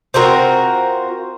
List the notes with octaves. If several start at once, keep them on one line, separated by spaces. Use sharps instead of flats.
C4 F4 F#4 A#4